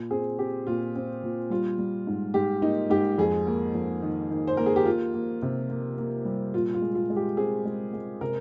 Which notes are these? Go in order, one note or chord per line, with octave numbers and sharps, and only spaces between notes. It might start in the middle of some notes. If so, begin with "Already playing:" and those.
Already playing: A#2
C4 G#4
C4 G4
A#2 F4
C4
A#2
G3 F4
G3
G#2
G#2 G4
A#3 D#4
G#2 G4
F2 G#4
A#3
F2
D#3
D#3
C5
A#3 A#4
G#4
G4
A#3 F4
A#3
C3
A#3
A#3
G3
A#2 F4
F4
G#3
F4
G#3
G4
C4 G#4
G#3
G#3
C3 A#4